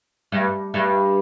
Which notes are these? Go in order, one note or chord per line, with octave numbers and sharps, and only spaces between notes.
G2
G2